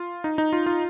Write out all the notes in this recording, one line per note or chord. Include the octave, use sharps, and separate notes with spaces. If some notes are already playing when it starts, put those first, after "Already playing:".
Already playing: F4
D#4
D#4
F4
F4